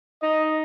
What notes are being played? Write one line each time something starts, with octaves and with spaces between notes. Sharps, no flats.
D#4 D#5